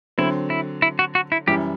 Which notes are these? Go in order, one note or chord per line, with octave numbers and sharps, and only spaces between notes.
D3 F#3 C4 E4
E4
E4
F#4
F#4
E4
F#2 E3 G3 G4